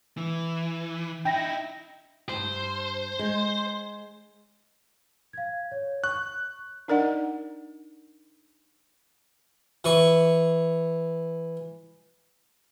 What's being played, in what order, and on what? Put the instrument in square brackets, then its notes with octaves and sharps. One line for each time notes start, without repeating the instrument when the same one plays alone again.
[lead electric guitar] E3
[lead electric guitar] D#4 E4 [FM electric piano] G5 A#6
[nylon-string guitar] E2 G2 [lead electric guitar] C5
[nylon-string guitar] G#3
[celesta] F5 G#6
C#5
[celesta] C#6 [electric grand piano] F#6
[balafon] D4 D#4 A#4 D5 D#5 F#5
[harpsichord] E3 C#6